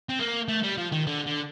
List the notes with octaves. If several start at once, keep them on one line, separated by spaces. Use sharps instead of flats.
C4
A#3
A3
G3
F3
D#3
D3
D3